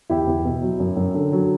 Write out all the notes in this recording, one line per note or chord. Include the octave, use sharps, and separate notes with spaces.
E2 E4 G4
E2
B2
F#3
F#2
F#2
D3
F#3